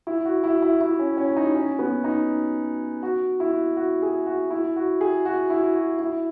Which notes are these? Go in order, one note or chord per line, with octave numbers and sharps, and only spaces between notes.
E4
F#4
E4
E4
E4
C#4
C#4
D#4
C#4
B3
D#4
F#4
E4
F#4
G#4
F#4
E4
F#4
G#4
F#4
E4
F#4
E4